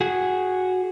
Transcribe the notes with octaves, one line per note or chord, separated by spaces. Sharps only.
F#4 G#4